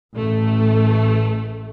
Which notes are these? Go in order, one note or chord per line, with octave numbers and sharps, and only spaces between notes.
A1 A3